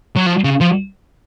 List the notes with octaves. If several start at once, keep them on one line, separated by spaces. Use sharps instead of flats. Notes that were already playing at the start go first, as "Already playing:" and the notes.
F#3
F3
C#3
F3